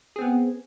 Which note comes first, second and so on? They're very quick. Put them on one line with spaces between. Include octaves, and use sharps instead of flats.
G#4 C4 B3